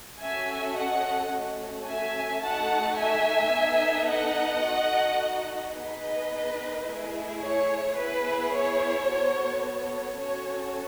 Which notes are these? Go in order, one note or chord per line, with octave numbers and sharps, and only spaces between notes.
C#4 F#4 A4 E5 G#5
D#5 F#5
A3 C#4 F#4
E5 G#5
A3 D#4 F#4 A4 F#5 A5
E5 G#5
B3 D#4 A4
D#5 F#5
D#4 F#4 A4
B3 D#4 G#4 B4 D#5
A3 E4 G#4
C#5
B3 E4 G#4 B4
C#5
B3 F#4 A4
C#5
C#4 F#4 A4 C#5